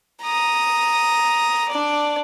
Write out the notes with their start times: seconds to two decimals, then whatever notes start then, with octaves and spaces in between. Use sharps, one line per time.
0.22 A#5 D#6
1.69 D4 D5